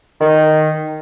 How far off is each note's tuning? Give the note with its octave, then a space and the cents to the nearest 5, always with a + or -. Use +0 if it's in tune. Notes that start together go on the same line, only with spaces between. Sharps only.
D#3 -5